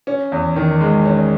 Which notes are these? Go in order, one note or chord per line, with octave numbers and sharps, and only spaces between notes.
C#4
E2
D#3
G#3
C#4